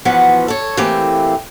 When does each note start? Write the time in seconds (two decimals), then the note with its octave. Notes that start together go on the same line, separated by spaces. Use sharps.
0.05 E3 F3 B3 F#4
0.48 A4 C#5
0.77 E3 A3 A#3 C4 G4